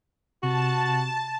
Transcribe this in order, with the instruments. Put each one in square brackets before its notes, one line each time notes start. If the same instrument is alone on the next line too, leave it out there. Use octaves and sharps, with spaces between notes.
[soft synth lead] C3 [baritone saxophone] F#4 [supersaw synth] A5